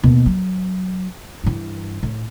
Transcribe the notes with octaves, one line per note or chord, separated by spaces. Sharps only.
D#2 B2
F#3
G2 E3
A2